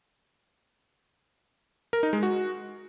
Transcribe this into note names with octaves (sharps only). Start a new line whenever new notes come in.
A#4
D#4
G#3
F#4